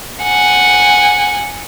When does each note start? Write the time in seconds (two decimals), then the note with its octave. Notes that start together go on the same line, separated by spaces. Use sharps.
0.23 F#5 G#5